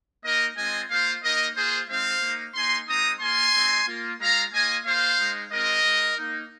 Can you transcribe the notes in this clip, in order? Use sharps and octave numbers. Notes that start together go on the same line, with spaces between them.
A#3 D#4 A#4 D#5
G#3 C4 F4 D#5 G#5
A#3 F4 C5 F5
A#3 D#4 A#4 D#5
A#3 F4 G#4 C5
G#3 C4 D#4 C5 F5
A#3 D#4
A#3 D#4 G#5 C6
G#3 C4 D#4 A#5 D#6
A#3 F4 G#5 C6
G#3 C4 D#4
A#3 F4
G#3 F4 F5 A#5
A#3 F4 D#5 G#5
A#3 F4 C5 F5
G#3 D#4
G#3 C4 F4 A#4 D#5
G#3 D#4
A#3 D#4